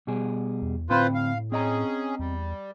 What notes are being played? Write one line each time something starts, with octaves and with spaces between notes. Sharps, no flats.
B2 G3 G#4
E2
D2 A2 C4 F4 B4 C5 B5
F5
C4 C#4 G#4 D#5 A#5
E2 G3